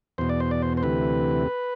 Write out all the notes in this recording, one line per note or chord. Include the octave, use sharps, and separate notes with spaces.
E2 B2 C5
D5
C5
D5
C5
C5
D2 C3 E3 B4